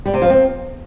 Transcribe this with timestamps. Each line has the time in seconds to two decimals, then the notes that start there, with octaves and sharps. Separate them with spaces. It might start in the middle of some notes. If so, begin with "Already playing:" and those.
0.06 G3
0.14 C3
0.22 F3
0.30 C4